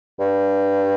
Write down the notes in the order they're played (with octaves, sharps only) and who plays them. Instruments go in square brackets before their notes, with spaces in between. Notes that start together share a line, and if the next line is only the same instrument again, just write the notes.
[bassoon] G2